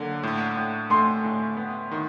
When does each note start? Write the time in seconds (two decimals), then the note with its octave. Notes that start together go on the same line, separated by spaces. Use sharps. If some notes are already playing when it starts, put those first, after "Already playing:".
Already playing: D3 F#3 A#3
0.23 A2
0.57 A2
0.90 A3 C6
1.24 A2
1.57 B3
1.91 D#3